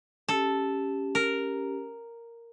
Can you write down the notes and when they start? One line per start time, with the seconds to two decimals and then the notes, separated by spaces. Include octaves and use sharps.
0.29 C#4 G4 A4
1.15 A#4